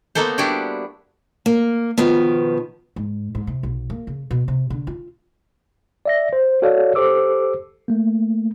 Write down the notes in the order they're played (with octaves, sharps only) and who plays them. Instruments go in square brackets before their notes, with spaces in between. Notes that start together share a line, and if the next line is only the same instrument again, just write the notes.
[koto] A#3 B3 D#4 A4 C5
G3 D4 E4 F#4 G4
[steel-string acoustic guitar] A#3
B2 D#3 F3 B3
[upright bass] G#2
G#2
C3
B1
A#3
C#3
B2
C3
D3
F4
[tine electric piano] D5 E5 A#6
C5
F#4 A4 C#5 D5 F5
G4 A4 C5 D6 E6
A3 A#3